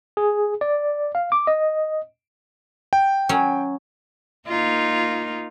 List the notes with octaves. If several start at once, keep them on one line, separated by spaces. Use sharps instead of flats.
G#4
D5
F5
D6
D#5
G5
F#3 C#4
A#3 D#4 F4